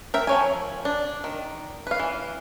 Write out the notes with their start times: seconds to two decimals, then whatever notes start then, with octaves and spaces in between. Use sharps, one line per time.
0.14 A#4 E5 G5
0.27 F3 C#5 G#5
0.85 D4
1.24 D#3
1.87 B4 F5
1.99 E3